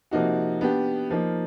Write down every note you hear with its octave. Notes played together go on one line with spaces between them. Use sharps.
C3 F3 A#3 D#4 F#4
B3 D4 G4
F3 A#3 D#4